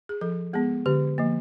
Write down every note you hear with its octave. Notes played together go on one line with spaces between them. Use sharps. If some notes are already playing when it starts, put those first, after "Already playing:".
G#4
F3 A4
G#3 B3 G#4
D3 G4
F3 A#3